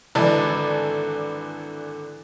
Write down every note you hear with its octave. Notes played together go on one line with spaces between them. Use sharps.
G#1 D3 E3 B4 D5 A5